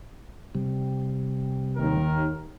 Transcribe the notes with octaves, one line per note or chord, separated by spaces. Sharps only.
C3 G3
D#2 D#3 A#4